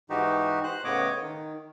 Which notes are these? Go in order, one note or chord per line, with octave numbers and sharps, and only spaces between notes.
G#2 E3 D#4 F#4 G4
C5 F#6
A2 C#3 B3 C#5 D#5 D6
D#3